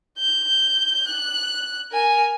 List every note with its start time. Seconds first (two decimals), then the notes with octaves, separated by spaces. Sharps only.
0.19 G6
1.08 F#6
1.92 A#4 G#5